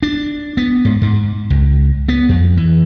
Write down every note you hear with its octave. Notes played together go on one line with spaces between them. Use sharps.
D4
B3
G#2
G#2
C#2
B3
F2
E3